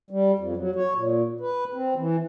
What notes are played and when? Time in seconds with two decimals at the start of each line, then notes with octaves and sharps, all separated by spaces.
0.10 G3
0.39 F2
0.57 F#3
0.76 C#5
0.94 A#2
1.40 B4
1.73 C4
1.96 E3